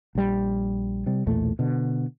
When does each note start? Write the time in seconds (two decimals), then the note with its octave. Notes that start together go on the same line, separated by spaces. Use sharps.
0.15 A#1 G3
1.06 C3 G3
1.26 B1 E2 A#2 A3
1.59 B2 D3